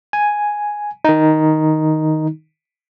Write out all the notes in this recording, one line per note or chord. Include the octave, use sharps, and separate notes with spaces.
G#5
D#3 D#4